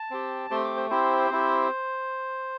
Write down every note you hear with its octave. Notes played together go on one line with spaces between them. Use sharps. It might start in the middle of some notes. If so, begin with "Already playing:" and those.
Already playing: A5
C4 G4
A3 C4 G4 C6
D6
C5
C4 E4 G4 C5
C4 E4 G4